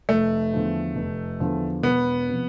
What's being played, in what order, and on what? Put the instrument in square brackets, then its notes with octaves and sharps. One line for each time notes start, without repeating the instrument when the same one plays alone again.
[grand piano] F1 [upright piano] A3
[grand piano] E2 D3 F3
F1
E2 D3 F3
[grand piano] E1 [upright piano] B3
[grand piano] C3 F3